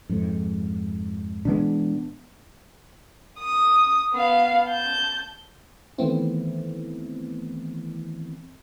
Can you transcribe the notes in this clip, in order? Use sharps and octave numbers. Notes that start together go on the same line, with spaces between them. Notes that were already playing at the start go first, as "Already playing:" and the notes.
F2 G#2
B2 E3 G#3 B3 D4
D#6
B3 F5
A5 G6
D#3 E3 A3 B3 C4 E4